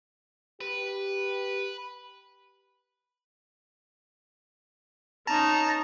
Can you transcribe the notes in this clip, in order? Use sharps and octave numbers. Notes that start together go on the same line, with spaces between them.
G4 B4
C#4 D#4 A5 A#5